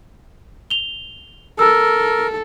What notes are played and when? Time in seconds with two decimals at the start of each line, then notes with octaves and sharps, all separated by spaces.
0.70 F7 G7
1.59 A4 A#4 E6